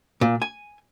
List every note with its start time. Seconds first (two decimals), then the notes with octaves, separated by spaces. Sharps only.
0.21 A#2
0.42 G#5